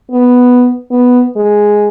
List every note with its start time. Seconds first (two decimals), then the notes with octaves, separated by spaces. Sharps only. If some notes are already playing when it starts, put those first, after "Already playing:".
0.11 B3
0.91 B3
1.36 G#3